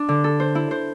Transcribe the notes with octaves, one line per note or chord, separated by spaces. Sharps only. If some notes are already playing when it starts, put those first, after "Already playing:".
Already playing: D4
D3
A4
C5
E4
C5